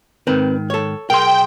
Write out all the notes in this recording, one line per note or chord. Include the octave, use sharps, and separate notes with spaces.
G#2 D#3 C4 A#4 B4
A4 C#5
B1 G#4 A#4 G5 C6